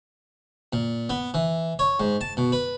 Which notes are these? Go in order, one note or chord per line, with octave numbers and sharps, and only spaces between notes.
A#2
B3
E3
C#5
G#2
A5
B2
B4